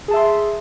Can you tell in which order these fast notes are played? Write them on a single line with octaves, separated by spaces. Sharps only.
G#4 A5 E5 C6